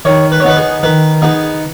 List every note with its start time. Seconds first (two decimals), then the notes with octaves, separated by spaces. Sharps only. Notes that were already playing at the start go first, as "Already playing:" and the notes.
0.05 D#3 C#5
0.32 B4
0.40 C#5
0.44 B3 D#4 B4
0.57 G#4
0.83 D#3 B4
1.22 B3 D#4 G#4